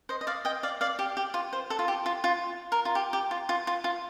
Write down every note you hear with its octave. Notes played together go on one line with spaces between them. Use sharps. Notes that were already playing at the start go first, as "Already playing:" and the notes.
C5 D#5
D#5
D5 F5
D#5 G5
D5 F5
D5 F5
G4
G4
F4
C5
A4
F4
G4
F4
F4
A#4
F4
G4
G4
F4
F4
F4
F4